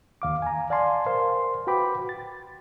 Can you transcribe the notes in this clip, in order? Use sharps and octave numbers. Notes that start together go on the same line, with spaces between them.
D#2 F5 D6
G#5 A#5
D5 F5 G#5 A5 C6
A#4 C5 F5 C6
F#4 B4 G5 B5 D6
A6